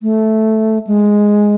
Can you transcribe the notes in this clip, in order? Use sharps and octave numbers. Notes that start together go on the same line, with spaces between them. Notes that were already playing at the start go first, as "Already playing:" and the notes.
A3
G#3